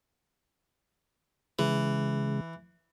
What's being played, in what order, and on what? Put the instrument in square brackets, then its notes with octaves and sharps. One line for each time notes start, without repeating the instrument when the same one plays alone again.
[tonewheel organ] C#3 G#3 [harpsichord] E3